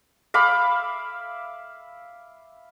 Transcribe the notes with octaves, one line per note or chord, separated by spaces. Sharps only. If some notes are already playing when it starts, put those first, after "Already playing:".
E5 F5 B5 D6